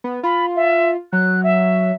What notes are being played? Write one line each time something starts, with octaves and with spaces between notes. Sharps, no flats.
B3
F4 B5
E5
F#3 F#6
E5